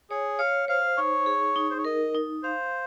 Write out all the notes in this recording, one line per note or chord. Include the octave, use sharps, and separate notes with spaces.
G#4 C#5
C#5 F5
C5 F5
D#4 C#5
G#4
D#4
C5
C#5
A#4 D#5
D#4
C5 F5